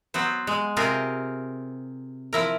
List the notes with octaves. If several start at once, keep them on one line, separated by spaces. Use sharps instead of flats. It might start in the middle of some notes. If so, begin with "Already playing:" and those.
F#3 B3 C5
G#3
C3 F4 G4 G#4 A#4
F3 E4 A#4